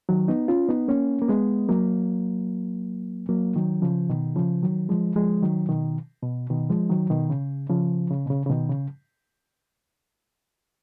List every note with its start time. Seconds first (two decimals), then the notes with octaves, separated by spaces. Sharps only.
0.09 D#3 F#3
0.28 B3 D#4
0.48 C#4 F4
0.69 B3 D#4
0.88 A#3 C#4
1.22 A#3
1.29 G#3 B3
1.69 F#3 A#3
3.29 F#3 A#3
3.56 D#3 F#3
3.82 C#3 F3
4.09 B2 D#3
4.36 C#3 F3
4.63 D#3 F#3
4.89 F3 G#3
5.16 F3 G#3
5.43 D#3 F#3
5.69 B2 D#3
6.22 B2
6.50 B2 D#3
6.70 F3 G#3
6.89 D#3 F#3
7.10 B2 D#3
7.30 C#3
7.70 C#3 F3
8.10 C#3
8.26 B2
8.30 C#3
8.46 C#3
8.50 B2 D#3
8.70 C#3